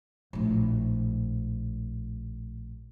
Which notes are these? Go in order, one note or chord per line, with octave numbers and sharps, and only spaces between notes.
A#1 A2